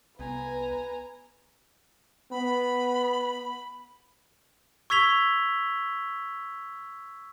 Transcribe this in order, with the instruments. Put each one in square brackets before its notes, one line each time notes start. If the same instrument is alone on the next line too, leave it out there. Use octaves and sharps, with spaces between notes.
[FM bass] C2 [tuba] B3 [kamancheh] B4 [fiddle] G#5 A#5
[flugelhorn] B3 [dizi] B5
[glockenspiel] C#6 E6 G#6 B6 F7 G7